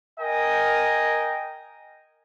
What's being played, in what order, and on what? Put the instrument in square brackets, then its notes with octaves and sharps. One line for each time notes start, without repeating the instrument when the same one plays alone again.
[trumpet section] A#4 D#5 G5 G#5